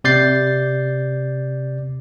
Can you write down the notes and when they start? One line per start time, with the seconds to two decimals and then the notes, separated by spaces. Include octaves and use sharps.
0.04 C3 D5 G6 A6 C7